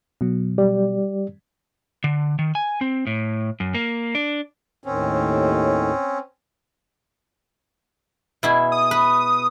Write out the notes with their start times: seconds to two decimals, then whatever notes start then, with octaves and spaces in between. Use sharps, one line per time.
0.21 B2 F#3
0.58 G3 G4 D5
2.04 D3
2.39 D#3
2.55 G#5
2.81 C4
3.07 A2
3.60 F#2
3.74 A#3
4.15 D4
4.84 D#2 A2 D#3 C4 C#4
8.43 B2 E4 G#4
8.72 D#6
8.91 B4